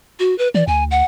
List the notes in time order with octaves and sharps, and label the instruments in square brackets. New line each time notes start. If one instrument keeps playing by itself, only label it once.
[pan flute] F#4
B4
[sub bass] E3 [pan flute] D5
[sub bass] D2 [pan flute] G#5
[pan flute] F#5